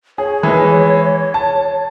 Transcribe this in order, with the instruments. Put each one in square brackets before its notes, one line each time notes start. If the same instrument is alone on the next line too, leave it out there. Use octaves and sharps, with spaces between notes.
[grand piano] G#4 [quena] C#5
[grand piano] E3 G#3
A5